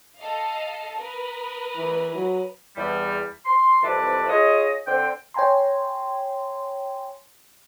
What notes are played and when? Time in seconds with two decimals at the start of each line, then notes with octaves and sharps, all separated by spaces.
0.18 A4 D#5 F5
0.98 A#4 B4 D#6
1.76 E3
2.14 F#3
2.76 E2 G3
3.45 C6
3.82 C2 F2 E3 B4 D5 A5
4.29 F4 G#4 C#5 D#5
4.87 D3 C4 C5 G5
5.34 C#5 G5 G#5 A#5 C6